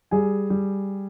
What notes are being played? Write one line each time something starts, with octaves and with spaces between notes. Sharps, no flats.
G3 G#4 G#5
G3